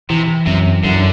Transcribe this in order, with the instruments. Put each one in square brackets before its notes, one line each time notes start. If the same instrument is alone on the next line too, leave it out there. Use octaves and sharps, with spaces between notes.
[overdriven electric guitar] C3 [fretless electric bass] E3
[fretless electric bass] F#2 [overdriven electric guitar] C3
[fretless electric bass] F#2 [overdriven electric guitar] D3